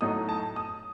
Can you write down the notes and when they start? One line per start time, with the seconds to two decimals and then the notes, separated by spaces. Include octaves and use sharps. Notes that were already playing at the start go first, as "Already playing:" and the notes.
0.01 A2 F#3 A3 D#4 D#6
0.29 A5
0.56 D#6